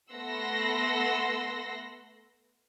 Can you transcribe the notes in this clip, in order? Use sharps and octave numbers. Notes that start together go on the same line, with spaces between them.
A3 B3 F#5 C6 E6 A#6